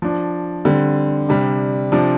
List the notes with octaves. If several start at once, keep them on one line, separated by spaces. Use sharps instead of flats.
F3 D4
D3 G3 C4
C3 G3 D4
C3 F3 D4